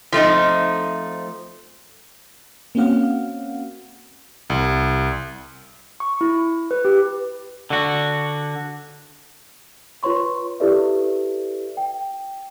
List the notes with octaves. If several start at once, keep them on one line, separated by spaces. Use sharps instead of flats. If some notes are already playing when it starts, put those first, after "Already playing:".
F3 A3 C4 D#4
A#3 C4 C#4 F#4 F5 F#5
C2
C#6
E4
B4
G4
D3 F#4
F4 B4 C#5 C6 C#6
E4 G4 A4 B4 D5 E5
G5